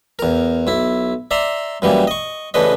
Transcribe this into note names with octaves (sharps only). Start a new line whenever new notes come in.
E2 A#4
B1 E4
D5 E5 A#5 C6
F#2 E3 G3 A#3
D#5 C#6
A1 C#3 D4 B4 D#5